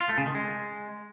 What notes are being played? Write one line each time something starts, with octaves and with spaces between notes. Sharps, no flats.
F4
A3
C#3
D#3
G#3